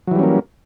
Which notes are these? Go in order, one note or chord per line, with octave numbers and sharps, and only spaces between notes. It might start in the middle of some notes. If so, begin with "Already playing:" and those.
E3 F#3 G3 A#3 C#4